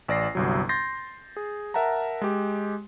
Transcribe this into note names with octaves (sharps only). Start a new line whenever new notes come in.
A1 D5 A#6 C7
G1 C2 F#3
C6 G6 A6 A#6 C7
G#4
A#4 E5 F#5 A5 A#5
G#3 G4